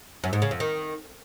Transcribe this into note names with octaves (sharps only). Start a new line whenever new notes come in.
F#2
G#2
C#3
F2
D#3